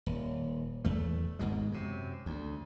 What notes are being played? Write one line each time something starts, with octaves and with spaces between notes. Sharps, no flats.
D#1
E2 A3
G#1 G#2 B2 G#3
F#2 C3
D2